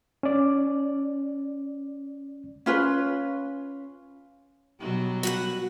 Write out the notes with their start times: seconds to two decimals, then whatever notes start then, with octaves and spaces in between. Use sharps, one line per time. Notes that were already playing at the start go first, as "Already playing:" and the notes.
0.23 C#4 D5
2.66 C#4 F4 B4
4.79 B2 F#3 G3
5.23 F#4 B4 F#5